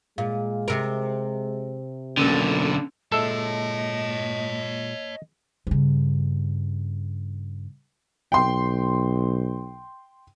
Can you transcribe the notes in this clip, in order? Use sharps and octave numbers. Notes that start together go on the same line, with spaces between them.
A#2 G#3 F5
C3 A#4
B1 D3 A#3 C#4 A4 E6
A#2 G#3 A4 C#5 D#5 E5 A5
G2 C#3
B1 G5 C6